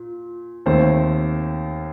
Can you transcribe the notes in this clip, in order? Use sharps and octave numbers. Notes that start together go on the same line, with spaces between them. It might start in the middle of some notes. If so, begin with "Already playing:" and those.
Already playing: A#2
D#2 D#3 A3 C4 C5